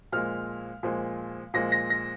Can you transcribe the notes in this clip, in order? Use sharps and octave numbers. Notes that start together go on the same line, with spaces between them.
A#2 F3 G#3 F6
A#2 F3 G#3
A#2 F3 G#3 A#6
A#6
A#6